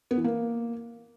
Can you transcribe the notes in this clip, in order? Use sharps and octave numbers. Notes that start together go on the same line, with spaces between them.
B3
E3
A#3